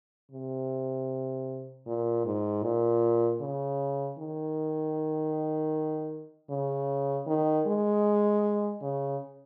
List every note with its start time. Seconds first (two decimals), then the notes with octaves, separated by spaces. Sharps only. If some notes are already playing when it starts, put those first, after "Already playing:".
0.31 C3
1.87 A#2
2.25 G#2
2.63 A#2
3.41 C#3
4.19 D#3
6.50 C#3
7.27 D#3
7.67 G#3
8.82 C#3